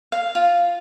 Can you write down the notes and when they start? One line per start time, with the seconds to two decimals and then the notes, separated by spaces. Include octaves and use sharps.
0.12 F5
0.35 F4